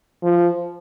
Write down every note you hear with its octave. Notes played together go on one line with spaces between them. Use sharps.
F3